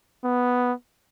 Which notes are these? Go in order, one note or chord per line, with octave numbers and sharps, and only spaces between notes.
B3